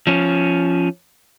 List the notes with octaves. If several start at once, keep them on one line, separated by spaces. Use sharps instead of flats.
F3 C#4